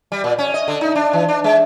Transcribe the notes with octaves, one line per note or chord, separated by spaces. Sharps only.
G3
A#2
C#4
D#5
D3
D#4
D4
E3
D4
G#3